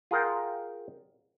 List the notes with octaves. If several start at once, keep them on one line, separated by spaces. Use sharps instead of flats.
F4 G#4 A#4 F#5 G5